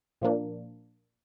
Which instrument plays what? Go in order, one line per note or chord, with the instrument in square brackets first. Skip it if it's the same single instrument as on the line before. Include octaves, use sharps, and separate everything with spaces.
[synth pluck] A#2 F3 A#3 D4